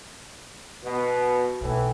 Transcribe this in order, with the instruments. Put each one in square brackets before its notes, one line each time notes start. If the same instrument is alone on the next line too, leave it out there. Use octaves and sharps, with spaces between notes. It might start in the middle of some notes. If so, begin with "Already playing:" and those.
[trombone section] B2
[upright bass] B1 A3 [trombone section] A2 E3